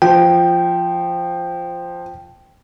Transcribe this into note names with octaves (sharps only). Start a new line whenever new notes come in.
F3 G5